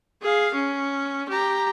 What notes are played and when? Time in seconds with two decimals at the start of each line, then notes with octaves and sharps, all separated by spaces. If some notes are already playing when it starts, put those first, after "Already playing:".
0.22 G#4 F5
0.54 C#4
1.29 G4 A#5